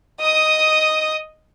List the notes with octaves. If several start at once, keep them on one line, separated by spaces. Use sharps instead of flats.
D#5 D#6